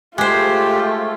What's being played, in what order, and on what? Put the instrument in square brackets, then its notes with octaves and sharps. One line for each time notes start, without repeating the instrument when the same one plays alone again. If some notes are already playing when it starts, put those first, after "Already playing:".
[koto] G#3 C5 [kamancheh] A3 F4 [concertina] G4